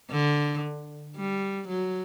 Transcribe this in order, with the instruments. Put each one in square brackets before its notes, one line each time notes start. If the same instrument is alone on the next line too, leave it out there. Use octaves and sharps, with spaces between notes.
[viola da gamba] D3
G3
F#3